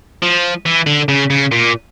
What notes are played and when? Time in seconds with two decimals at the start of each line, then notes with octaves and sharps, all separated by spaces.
0.23 F3
0.66 E3
0.87 D3
1.09 C#3
1.30 C#3
1.52 A#2